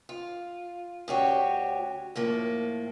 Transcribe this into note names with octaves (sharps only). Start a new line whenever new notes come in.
F4
D2 C#4 F#4 G4
A2 F3 A#3